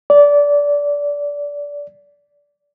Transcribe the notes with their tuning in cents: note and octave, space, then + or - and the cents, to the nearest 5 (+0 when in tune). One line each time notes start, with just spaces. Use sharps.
D5 -20